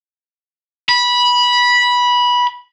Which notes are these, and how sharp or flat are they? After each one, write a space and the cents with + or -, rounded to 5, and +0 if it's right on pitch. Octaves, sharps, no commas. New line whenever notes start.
B5 -15